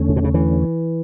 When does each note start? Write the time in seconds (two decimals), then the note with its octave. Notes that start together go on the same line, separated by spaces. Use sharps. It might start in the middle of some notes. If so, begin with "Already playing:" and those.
Already playing: E2 D3 A3 C#4
0.09 C#3
0.16 B2
0.24 C#3
0.34 E3